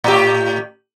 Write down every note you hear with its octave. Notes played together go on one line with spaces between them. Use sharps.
A2 G4